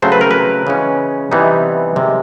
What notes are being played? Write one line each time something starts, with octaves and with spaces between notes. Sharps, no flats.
C#3 F#3 A3 C4 C5
B4
A#4
B4
C#3 E3 G#3 C#4
C3 E3 G3 B3 D#4
C3 D#3 G#3